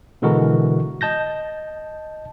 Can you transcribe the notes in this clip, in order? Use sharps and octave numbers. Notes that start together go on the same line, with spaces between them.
B2 D3 E3 G#3 F#4 A#4
D#5 A5 G6 A#6